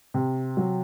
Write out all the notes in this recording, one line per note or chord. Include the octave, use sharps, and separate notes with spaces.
C3
F#3